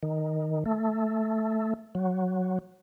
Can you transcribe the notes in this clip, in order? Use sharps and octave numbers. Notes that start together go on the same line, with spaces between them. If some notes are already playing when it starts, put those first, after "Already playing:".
D#3
A3
F#3